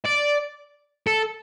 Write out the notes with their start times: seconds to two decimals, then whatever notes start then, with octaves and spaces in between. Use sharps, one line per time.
0.06 D5
1.07 A4